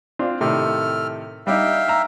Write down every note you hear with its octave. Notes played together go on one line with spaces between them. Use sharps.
C4 D4 F4
A2 C3 D#3 A4 F6
G3 D4 D#4 E5 F5 G5
A#5 E6